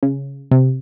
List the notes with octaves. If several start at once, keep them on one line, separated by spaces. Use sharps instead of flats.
C#3
C3